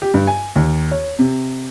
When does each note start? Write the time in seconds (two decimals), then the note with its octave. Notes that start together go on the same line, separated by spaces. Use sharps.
0.02 G4
0.14 G2
0.27 G#5
0.56 D#2
0.91 C#5
1.19 C3